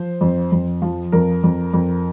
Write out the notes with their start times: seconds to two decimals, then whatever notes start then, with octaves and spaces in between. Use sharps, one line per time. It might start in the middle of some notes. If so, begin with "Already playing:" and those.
Already playing: F3 C5
0.21 F2
0.52 F2
0.82 F3
1.12 F2 A#4
1.44 F2
1.74 F2